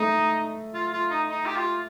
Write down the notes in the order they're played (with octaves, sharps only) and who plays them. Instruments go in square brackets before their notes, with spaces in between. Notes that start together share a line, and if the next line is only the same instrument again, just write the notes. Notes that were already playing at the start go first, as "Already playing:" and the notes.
Already playing: [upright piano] A3 [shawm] D#4
[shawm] F4
F4
D#4
D#4
G4
F4